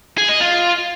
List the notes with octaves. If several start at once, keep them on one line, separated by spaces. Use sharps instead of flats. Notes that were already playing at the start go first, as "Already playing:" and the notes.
G#4
D#5
F4